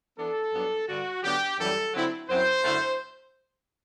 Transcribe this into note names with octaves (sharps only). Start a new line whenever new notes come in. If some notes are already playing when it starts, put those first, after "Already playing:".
E3 B3 D4 A4
G2 F#3 B3 D4
G2 D3 G3 F#4
D3 F#3 B3 D4 G4
F#2 E3 G3 A4
D3 F#3 C4 E4
F#2 F#3 C4 E4 C5
F#2 D3 A3 E4